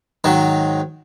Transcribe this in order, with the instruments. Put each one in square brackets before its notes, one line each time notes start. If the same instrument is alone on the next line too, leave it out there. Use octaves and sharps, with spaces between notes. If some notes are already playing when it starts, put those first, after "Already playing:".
[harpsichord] G#2 D#3 F#3